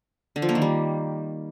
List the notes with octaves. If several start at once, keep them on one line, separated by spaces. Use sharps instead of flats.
D3
F3
A#3
D#3
G3